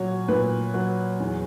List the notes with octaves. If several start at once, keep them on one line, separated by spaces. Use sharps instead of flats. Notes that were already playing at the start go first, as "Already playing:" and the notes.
Already playing: A#2 F#3 C#5
A#2 B4
F#3
E2